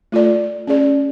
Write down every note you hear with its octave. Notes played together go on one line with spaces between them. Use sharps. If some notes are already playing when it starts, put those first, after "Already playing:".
A3 F4 A4 D5
C#4 G#4 D5